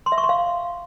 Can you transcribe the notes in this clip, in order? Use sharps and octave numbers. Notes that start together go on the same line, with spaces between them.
C6
E5
C#6
C6
F5